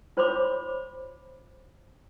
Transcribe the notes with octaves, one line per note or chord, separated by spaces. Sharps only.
F4 C5 C#5 B5 C6 D6